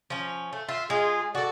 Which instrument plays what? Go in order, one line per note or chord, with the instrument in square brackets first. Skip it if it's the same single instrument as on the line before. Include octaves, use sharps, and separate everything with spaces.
[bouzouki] F3 C#4
A3
[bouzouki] F4 [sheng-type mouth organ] E5 C6
[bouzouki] G#3 F4 [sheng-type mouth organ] G#4
[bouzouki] F#4 A4 [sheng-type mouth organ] D5